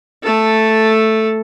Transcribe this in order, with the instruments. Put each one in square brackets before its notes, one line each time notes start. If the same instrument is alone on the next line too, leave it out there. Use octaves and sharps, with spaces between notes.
[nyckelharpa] A3 A4